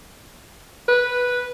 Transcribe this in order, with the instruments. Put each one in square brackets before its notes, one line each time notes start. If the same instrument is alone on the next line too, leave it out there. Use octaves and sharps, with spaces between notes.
[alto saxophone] B4